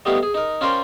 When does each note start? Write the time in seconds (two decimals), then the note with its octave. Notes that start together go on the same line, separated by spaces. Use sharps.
0.05 G3 A3 B3 D#4 G4 F5
0.23 G#4
0.34 D#4 A#4
0.61 C#4 F4 A#4 C5 D5 G5